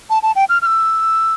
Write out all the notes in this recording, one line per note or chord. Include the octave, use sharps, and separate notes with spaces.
A5
A5
G5
F6
F6
E6